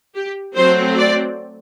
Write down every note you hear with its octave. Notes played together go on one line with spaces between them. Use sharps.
G4
F#3 A3 C4 C5
D5